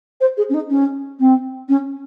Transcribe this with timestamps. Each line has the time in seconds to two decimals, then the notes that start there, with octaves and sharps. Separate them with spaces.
0.21 C5
0.37 G#4
0.49 C#4
0.54 D#4
0.70 C#4
1.19 C4
1.69 C#4